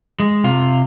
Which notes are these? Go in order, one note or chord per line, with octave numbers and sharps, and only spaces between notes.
G#3
C3 F4